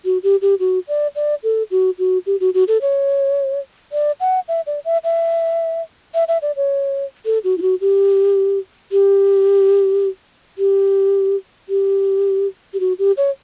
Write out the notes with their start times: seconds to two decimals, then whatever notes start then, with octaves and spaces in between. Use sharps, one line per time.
0.05 F#4
0.23 G4
0.42 G4
0.60 F#4
0.88 D5
1.16 D5
1.43 A4
1.71 F#4
1.99 F#4
2.26 G4
2.40 F#4
2.54 F#4
2.68 A4
2.82 C#5
3.92 D5
4.20 F#5
4.48 E5
4.67 D5
4.85 E5
5.04 E5
6.14 E5
6.28 E5
6.42 D5
6.56 C#5
7.25 A4
7.44 F#4
7.58 E4
7.62 F#4
7.81 G4
8.92 G4
10.58 G4
11.69 G4
12.73 G4
12.80 F#4
12.99 G4
13.17 C#5